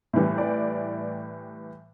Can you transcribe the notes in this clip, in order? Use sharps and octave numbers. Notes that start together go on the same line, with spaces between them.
A2 E3 G3
D5